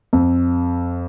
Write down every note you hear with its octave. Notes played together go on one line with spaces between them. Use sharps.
F2